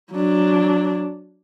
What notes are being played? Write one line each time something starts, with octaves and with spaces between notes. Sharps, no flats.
F#3 D4